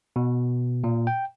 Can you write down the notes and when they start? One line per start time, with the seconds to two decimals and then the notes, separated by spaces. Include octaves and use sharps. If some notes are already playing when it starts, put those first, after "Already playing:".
0.16 B2
0.84 A#2
1.07 G5